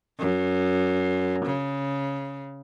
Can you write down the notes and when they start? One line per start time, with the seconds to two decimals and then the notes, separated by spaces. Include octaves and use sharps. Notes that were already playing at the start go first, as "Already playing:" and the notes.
0.19 F#2
1.45 C#3